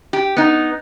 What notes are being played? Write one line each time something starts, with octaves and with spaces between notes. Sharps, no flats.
G4
B3 D#4